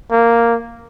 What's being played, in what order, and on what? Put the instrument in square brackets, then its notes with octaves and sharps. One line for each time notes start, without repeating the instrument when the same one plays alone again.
[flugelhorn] A#3